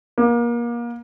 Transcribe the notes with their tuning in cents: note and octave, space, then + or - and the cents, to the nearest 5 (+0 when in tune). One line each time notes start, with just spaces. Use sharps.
A#3 +30